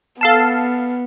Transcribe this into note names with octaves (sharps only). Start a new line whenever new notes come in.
B3 A4 F5 A5